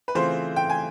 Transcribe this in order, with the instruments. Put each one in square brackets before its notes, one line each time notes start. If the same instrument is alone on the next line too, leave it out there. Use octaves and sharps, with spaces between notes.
[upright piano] B4
[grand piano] C#3 E3 A3 C4 F4 [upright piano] C5
[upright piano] G5
G#5